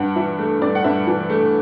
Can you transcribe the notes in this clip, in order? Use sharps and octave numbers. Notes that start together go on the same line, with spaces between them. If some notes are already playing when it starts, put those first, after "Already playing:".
Already playing: G2 F#5
E3 E5
A3
G2 D5
F#5
G2 E5
E3
A3